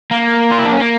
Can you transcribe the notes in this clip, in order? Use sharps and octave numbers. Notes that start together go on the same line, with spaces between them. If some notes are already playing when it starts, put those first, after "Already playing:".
A#3
F4
E4
D4
C#4
A#3